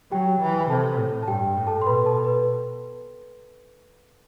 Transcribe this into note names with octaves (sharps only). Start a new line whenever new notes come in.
F#3 G4 G5
E3
B5
C3 A4 A5
A2
A5
G2 G4 G5
A2
A4 A5
C6
B2 B4 B5
A4 A5
B4